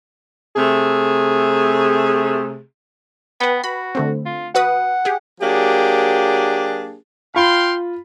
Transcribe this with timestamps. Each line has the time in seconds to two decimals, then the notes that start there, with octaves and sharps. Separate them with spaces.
0.56 C3 A3 G#4
3.40 B3 B4 G5
3.64 F#4 B5
3.95 D3 A3 C4
4.26 F4
4.55 F#4 B4 F#5 D#6
5.05 G4 G#4
5.41 F#3 A#3 D4 G4 G#4
7.35 F4 F5 G5 B5 C6